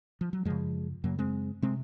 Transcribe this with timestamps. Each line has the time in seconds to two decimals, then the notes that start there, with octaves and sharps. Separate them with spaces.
0.21 F3
0.33 F#3
0.45 F#2 C#3 F3 G#3
1.04 F#2 C#3 F#3 A#3
1.19 G#3 C4
1.62 C3 G#3 C4